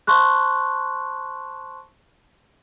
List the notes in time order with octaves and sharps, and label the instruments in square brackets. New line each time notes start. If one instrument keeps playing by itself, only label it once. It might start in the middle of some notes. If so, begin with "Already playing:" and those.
[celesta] C5 A5 C6 C#6 F#6